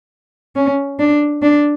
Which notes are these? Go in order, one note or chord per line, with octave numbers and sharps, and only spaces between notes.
C#4
D4
D4